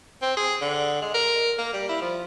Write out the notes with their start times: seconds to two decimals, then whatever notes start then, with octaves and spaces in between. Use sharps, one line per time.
0.22 C4
0.37 G#4
0.61 D3
1.02 G#3
1.14 A#4
1.58 A#3
1.73 G3
1.89 E4
2.01 F3